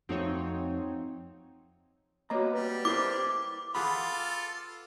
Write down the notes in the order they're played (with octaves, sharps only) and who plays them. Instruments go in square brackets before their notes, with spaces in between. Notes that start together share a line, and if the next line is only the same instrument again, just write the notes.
[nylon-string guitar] F2 A3 F#4 [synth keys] C4 D#4 C#5
[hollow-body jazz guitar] A#3 B3 A#5 [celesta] F#4 C#5 D#5
[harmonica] G3 [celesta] B4
[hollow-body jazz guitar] E4 A#4 C5 [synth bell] D6
[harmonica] F4 A4 [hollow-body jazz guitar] G#4 F#5 B5